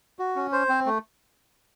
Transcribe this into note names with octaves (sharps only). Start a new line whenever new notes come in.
F#4
C#4
C5
C4
A3